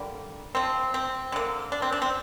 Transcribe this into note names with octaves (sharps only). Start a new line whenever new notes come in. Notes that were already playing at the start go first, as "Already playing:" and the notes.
Already playing: D3 G3 A#3
F3 C4
C4
D3 A#3
D4
C4
D4
C4